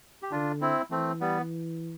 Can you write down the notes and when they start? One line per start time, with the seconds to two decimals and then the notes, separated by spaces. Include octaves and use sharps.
0.23 G4
0.31 D3 D4 F4
0.61 C4 E4
0.91 E3 A3 C4
1.21 G3 B3